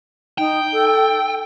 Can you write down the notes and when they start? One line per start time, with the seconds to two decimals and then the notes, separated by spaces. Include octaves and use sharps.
0.38 D#4 G5
0.73 A4